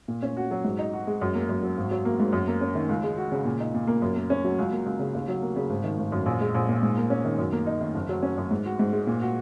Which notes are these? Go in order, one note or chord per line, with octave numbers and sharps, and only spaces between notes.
A#2
C#4
F#4
F#3
G#2
D#4
F#4
G#3
F#2
A#3
F#2
F#3
G#1
F#3
A#3
G#2
F#2
A#3
C#4
D#3
C#2
G#3
F#4
C#3
A#2
D#4
A#2
A#3
F#2
A#3
C#4
F#3
C#2
A#3
C#2
C#3
D#2
F#3
A#3
C#3
G#1
D#3
G#1
F#2
A#1
G#3
A#1
A#2
G#2
A#3
C#4
D#3
F#2
A#3
D#4
D#3
F#1
F#3
C#4
F#2
G#2
F#4
G#2
G#3
A#2
F#4